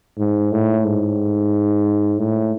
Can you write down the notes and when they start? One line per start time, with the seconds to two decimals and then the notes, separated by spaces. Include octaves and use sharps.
0.18 G#2
0.52 A2
0.85 G#2
2.18 A2